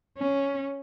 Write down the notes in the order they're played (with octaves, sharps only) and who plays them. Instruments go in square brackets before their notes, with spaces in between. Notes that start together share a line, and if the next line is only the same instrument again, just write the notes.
[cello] C#4